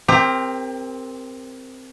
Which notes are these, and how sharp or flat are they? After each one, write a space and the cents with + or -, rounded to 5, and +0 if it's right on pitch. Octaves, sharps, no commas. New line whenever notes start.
C4 +0 G4 +35 A#4 +0